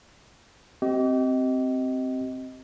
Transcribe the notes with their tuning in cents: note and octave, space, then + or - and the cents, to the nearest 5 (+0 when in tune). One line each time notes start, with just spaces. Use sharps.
C4 +0 G4 -35 D#5 +15